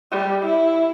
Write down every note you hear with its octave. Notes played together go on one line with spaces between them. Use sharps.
G3
E4